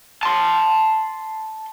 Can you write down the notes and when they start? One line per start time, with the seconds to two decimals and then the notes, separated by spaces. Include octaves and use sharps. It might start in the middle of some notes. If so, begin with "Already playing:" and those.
0.23 A5 C6